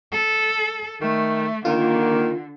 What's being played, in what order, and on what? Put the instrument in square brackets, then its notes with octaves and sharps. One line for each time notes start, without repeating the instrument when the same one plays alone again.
[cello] A4
[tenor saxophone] D#3 [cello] A3
[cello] D3 [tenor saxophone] D#3 [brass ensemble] A#3 [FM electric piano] F4